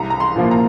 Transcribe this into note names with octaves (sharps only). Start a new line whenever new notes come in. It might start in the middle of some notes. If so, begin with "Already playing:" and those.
Already playing: C2 A#5
A#5
C6
A#2 F3 A#3
A#5